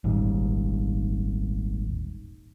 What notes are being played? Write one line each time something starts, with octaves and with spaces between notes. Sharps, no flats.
D#1 G#1 D#2